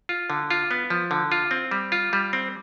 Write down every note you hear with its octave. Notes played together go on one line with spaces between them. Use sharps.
F4
D3
F4
B3
F3
D3
F4
C4
G3
F4
G3
C4